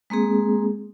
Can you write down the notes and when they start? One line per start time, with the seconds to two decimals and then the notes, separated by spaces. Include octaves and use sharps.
0.10 G#3 A#3 C4 G#4